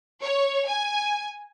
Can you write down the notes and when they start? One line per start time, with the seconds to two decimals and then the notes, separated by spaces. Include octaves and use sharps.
0.22 C#5
0.67 G#5